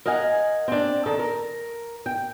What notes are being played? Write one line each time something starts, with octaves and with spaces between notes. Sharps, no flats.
A#4 D#5 F5 F#5 G#5
C4 D4
D#3 A4
A#4
G5